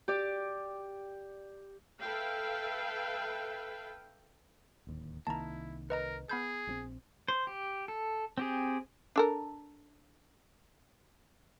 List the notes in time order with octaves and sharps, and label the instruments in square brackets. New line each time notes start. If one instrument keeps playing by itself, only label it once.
[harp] G4 D5
[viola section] A4 B4 E5 F5 G5
[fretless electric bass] D1 D#2
[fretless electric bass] C2 D#3 A#3 [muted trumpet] E4 [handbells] A5 A#5
[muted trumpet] A#4 [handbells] B4 D#5 A#5
[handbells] B3 B5 G6 [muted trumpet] G#4
[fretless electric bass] A#1 F#3 C4
[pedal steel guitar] C5
G4
A4
C4 G4 G#4
[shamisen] D4 A4 A#4